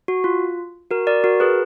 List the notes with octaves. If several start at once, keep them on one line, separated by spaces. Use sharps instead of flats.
F#4
F4
F#4 A#4
A#4 D5
F#4 A#4
G#4 B4